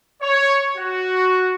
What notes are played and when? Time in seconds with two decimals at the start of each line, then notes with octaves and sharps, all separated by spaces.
0.21 C#5
0.76 F#4